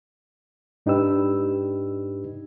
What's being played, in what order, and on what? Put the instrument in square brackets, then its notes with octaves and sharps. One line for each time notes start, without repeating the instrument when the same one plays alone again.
[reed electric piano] G#2 D4 D#4 G4 B4 E6